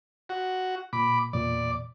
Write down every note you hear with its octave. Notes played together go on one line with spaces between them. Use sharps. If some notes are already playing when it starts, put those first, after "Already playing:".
F#4
A#2 B5 D6
E2 A#2 D5